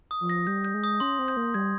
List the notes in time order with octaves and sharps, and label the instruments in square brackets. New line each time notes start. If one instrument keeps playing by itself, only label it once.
[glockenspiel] D#6
[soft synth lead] F3
[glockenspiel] A#6
[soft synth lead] G3 [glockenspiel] G6
[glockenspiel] G6
[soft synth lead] G#3
[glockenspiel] D#6
[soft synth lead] C#4 [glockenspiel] C6
[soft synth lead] C4
[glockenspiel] G6
[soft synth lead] A#3
[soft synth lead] G3 [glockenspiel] G#6